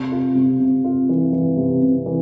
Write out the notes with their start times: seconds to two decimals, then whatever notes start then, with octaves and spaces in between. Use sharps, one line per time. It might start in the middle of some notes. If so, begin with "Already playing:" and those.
Already playing: C3
0.12 F4
0.35 C3
0.60 C3
0.84 F4
1.09 E3
1.33 E3
1.57 C3
1.81 C3
2.06 E3